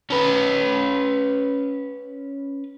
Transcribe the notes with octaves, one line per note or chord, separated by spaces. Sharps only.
C#4 B4